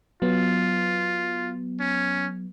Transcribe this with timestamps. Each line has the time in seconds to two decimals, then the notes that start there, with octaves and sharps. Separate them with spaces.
0.22 F#3 B3 F4
1.80 C#4